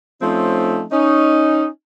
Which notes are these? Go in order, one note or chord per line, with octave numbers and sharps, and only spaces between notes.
F3 A3 C4 C#4 D#4
C#4 D#4